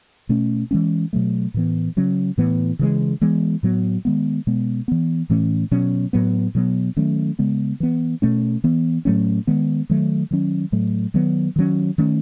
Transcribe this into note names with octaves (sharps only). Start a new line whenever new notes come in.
B2 A3 C#4
E3 G#3 C#4
B2 F#3 A3
A2 E3 B3
C#3 F#3 C#4
A2 E3 B3
C#3 E3 G#3
E3 G#3 B3
A2 F#3 B3
D#3 G#3 B3
B2 G#3 B3
E3 B3
A2 E3 A3 C#4
B2 F#3 C#4
A2 F#3 B3
B2 F#3 B3
D#3 F#3 A3 C#4
C#3 G#3 B3
E3 B3
B2 A3 C#4
E3 B3
A2 F#3 A3 C#4
D#3 G#3 B3
D#3 F#3 A3
D#3 F#3 C#4
A2 F#3 A3
D#3 F#3 B3
D#3 F#3 C#4
D#3 A3 C#4